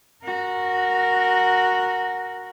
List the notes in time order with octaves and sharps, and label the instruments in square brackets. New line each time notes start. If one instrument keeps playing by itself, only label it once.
[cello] F#4 A#4